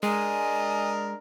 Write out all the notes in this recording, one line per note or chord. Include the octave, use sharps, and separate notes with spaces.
G#3 D4 A#4 D#5 G#5